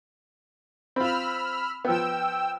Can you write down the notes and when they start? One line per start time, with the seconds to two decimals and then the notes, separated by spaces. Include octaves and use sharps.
0.96 C4 F4 B5 E6 F6
1.85 F3 B3 G5 E6